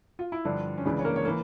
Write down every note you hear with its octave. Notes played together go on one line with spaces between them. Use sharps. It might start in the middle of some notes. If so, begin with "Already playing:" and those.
F4
E4
G2 D3 F3 D4
C#4
C#2 C#3 E3 D4
C#5
A#3 A#4
C#5
E3 A#3 A#4